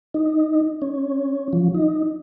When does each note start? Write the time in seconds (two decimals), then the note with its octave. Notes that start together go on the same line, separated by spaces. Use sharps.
0.14 D#4
0.82 C#4
1.53 F3
1.74 D#4